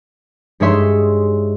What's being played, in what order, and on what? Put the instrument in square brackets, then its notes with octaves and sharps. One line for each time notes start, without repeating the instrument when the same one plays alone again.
[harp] G2 G#3 D#4 C#5 E5 C6